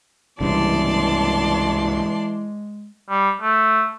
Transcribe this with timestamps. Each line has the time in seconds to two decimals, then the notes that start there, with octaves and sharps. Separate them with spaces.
0.41 C2 G2 C#3 E3 G#3 D5 A5 C6
3.10 G3
3.41 A3